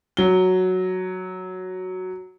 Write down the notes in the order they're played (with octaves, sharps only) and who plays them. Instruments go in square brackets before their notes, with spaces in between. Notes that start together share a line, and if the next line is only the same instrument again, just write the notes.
[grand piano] F#3 G7